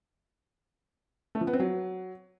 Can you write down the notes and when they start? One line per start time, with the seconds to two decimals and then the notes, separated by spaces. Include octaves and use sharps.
1.35 A3
1.41 F3
1.47 B3
1.53 C4
1.60 F#3